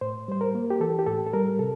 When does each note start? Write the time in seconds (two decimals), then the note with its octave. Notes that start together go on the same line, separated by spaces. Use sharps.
0.01 A2 C5
0.28 G3 C5
0.41 A#4
0.55 A#3
0.70 G4
0.80 E3 A4
0.99 G4
1.06 A2 A4
1.26 A4
1.33 G3 A#4
1.59 C3 A4